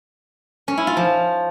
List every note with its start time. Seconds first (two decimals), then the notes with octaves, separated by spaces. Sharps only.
0.68 C#4
0.77 E4
0.87 F4
0.97 F3